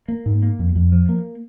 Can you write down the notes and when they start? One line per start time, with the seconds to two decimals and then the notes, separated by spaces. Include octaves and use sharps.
0.08 A#3
0.26 G#2
0.43 A#3
0.59 F2
0.75 F2
0.92 F3
1.09 A#3